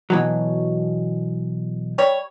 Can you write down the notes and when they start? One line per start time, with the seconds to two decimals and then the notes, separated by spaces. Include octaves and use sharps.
0.10 B2 E3 F#3
1.98 G3 C#5